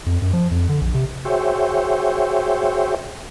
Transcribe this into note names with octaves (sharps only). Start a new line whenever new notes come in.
F2
F#2
F3
F2
D3
A#1
C3
F#4 G#4 C5 C#5 E5 G5